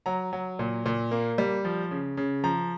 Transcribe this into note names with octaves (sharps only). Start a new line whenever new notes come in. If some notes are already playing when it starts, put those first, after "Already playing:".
F#3 A#5
F#3
A#2
A#2
A#3
G3
F3
C#3
C#3
F3 A#5